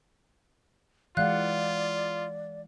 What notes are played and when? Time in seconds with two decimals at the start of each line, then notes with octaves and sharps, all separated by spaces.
1.17 E3 G#3 F4 D5 F5 F#5 F#6